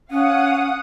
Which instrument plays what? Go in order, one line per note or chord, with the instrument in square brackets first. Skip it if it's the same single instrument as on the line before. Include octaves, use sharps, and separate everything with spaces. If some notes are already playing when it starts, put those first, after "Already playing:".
[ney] C#4 [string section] F5 F#5 D#6